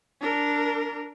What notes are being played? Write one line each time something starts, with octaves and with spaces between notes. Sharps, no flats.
D4 A#4